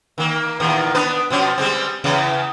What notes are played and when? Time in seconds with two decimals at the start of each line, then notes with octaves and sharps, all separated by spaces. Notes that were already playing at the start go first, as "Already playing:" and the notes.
0.18 D#3 A#3
0.60 E2 A#2 D#3
0.95 B3 D4 B4
1.30 B2 F3 C#4
1.58 G3 G#3 C4
2.04 E2 C#3 E3